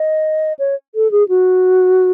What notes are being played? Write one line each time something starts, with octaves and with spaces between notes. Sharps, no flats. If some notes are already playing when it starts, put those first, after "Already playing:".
Already playing: D#5
C#5
A4
G#4
F#4